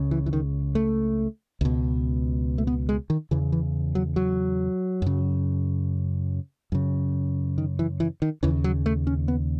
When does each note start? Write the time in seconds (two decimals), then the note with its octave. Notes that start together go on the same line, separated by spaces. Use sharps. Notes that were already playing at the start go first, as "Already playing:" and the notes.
Already playing: C#2 C#3
0.11 E3
0.26 E3
0.33 D#3
0.75 A3
1.61 C#2 B2
2.58 A3
2.67 B3
2.89 G#3
3.10 D#3
3.31 E2 C#3 E3
3.52 E3
3.95 F#3
4.16 F#3
5.02 F#2 C#3
6.72 F#2 C#3
7.58 D#3
7.79 E3
8.00 E3
8.22 D#3
8.43 D#2 C#3 E3
8.64 F#3
8.86 A3
9.07 C#4
9.28 B3